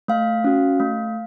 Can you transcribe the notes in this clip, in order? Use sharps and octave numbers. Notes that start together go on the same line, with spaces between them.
A3 F5
C#4 F#4
A3